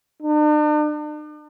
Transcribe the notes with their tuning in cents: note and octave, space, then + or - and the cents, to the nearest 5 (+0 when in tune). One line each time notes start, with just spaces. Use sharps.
D4 +45